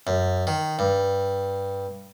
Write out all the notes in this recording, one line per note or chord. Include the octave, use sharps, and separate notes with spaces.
F#2
D#3
G2